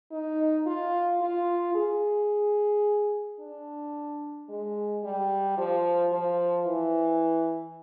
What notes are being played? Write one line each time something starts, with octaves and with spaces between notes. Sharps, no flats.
D#4
F4
F4
G#4
D4
G#3
G3
F3
F3
E3